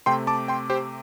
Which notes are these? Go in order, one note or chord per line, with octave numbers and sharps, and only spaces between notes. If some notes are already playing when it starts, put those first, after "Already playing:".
C3 A3 C4 G5 C6
A5 D6
G5 C6
G4 C5